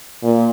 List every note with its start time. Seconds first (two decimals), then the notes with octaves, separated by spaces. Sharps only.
0.23 A#2